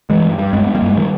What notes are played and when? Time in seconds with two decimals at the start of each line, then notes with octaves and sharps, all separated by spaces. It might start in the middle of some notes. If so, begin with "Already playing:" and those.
0.10 G2 E3 G#3
0.25 G2
0.39 G2
0.53 G2 G#3 B3
0.68 G2
0.75 G3 A#3
0.82 G2
0.90 G#3
0.97 D#3 G3